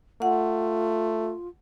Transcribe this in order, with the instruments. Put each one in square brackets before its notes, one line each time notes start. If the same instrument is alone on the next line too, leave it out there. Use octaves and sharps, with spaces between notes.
[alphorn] A3 [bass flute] F4 [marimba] F#5